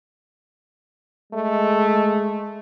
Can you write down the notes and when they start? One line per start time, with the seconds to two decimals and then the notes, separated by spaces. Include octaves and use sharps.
1.33 G#3 A3